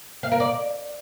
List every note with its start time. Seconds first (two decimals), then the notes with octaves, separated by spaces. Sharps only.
0.23 F5
0.32 A#4
0.40 D5